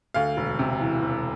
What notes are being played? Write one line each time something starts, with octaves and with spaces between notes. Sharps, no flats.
D2 F5
E1
C3
E3
E1